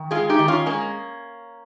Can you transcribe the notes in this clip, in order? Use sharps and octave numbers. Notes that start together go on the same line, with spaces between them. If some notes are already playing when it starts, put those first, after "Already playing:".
Already playing: D#3
G#3 F4 G#4
D#4 G4
D#3
C#4 F4
G#3 A#3 C#4